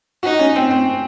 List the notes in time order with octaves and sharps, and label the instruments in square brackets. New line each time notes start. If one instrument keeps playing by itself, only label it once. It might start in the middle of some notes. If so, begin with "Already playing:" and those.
[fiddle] D#4 [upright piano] F#4
[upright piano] C#4
C4
C4